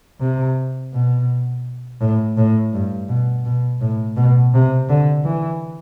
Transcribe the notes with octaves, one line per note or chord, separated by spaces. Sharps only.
C3
B2
A2
A2
G2
B2
B2
A2
B2
C3
D3
E3